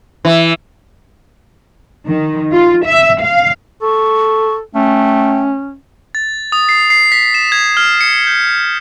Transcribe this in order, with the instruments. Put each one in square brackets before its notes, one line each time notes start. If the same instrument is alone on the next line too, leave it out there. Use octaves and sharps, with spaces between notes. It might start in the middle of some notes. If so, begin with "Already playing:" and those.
[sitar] E3
[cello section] D#3
F4
E5
F5
[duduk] A4 [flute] C#6
[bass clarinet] A3 [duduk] C#4 [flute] G5
[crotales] A6
D#6
C7
C7
B6
E7
G#6
F6
C#7
G6